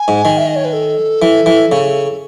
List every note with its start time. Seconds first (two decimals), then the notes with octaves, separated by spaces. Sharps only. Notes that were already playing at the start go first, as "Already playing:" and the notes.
Already playing: G#5
0.08 G#2
0.25 D#3
0.38 E5
0.47 D#5
0.56 C#5
0.65 B4
0.73 A4
1.22 E3
1.46 E3
1.72 C#3